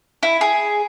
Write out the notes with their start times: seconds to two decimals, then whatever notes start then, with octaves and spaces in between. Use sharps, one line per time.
0.23 E4
0.41 G#4